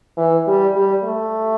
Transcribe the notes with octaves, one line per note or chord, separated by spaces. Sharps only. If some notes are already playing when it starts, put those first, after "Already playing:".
E3
G3
G3
A3